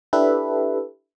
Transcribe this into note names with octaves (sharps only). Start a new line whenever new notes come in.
D4 E4 G4 A4 B4 E5